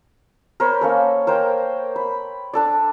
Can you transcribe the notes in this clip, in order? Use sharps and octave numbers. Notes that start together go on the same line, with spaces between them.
A#4 C5 C#5 B5
A#3 C#4 A4
A#4 C5 C#5 G5
B5
D4 A4 D5